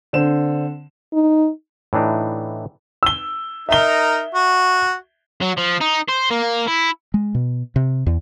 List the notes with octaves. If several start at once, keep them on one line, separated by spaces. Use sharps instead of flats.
D3 C4 C5 E7
D#4
A2 E3 D4 D#4
E6 G7
D#4 A#4 D#5 E5 G7
F#4
F#3
F3
D#4
C5
A#3
E4
G#3
B2
C3
E2